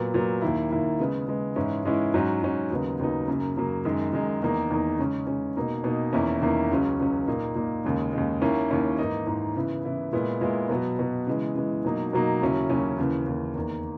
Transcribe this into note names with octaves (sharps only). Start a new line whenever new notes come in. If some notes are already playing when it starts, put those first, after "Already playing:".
Already playing: A#2 F#3 B3
A#2 F#3 B3
D#2 D#3 A#3 E4
D#2 D#3 A#3 E4
C#3 G#3 B3
C#3 G#3 B3
G#2 E3 G#3 C#4 E4
G#2 E3 G#3 C#4 E4
G#2 F#3 C#4
G#2 F#3 C#4
D#2 C#3 F#3 B3 D#4
D#2 C#3 F#3 B3 D#4
F#2 C#3 F#3 A#3
F#2 C#3 F#3 A#3
F#2 D#3 G#3
F#2 D#3 G#3
E2 D#3 A#3 D#4
E2 D#3 A#3 D#4
C#3 G#3 C#4
C#3 G#3 C#4
B2 A#3 D#4
B2 A#3 D#4
E2 D#3 A#3 C#4 E4
E2 D#3 A#3 C#4 E4
C#2 C#3 F#3 C#4
C#2 C#3 F#3 C#4
A#2 A#3 D#4
A#2 A#3 D#4
D#2 C#3 G#3
D#2 C#3 G#3
D#2 D#3 A#3 C#4 E4
D#2 D#3 A#3 C#4 E4
G#2 E3 A#3 D#4
G#2 E3 A#3 D#4
C#3 E3 B3 E4
C#3 E3 B3 E4
A#2 G#3 B3 E4
A#2 G#3 B3 E4
B2 F#3 B3
B2 F#3 B3
C#3 E3 G#3
C#3 E3 G#3
B2 F#3 A#3 D#4
B2 F#3 A#3 D#4
D#2 C#3 F#3 C#4 E4
D#2 C#3 F#3 C#4 E4
D#2 C#3 E3
D#2 C#3 E3
E2 D#3 A#3